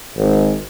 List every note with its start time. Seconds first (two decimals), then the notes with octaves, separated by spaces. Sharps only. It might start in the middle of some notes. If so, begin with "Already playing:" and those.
0.17 G#1